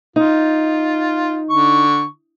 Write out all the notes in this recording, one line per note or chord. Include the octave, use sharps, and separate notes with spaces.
D#4 F4
D3 C#6